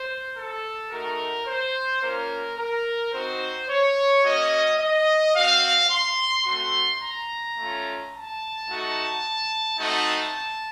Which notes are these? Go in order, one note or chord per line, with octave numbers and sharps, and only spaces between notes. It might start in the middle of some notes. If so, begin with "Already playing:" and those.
Already playing: C5
A4
A3 D#4 F#4 A#4
C5
A#3 C#4 F4 A#4
A#4
C4 D#4 F#4 C5
C#5
A#3 C#4 F#4 D#5
D#5
C4 F#4 F5
C6
A3 C4 F#4 C6
A#5
A3 C#4 F4
A5
A3 D#4 F#4
A3 C4 D#4 F#4 A5